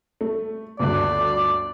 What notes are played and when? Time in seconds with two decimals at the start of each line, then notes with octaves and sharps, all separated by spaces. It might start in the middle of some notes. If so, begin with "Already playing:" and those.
0.21 A3
0.79 G1 D2 D5 F#6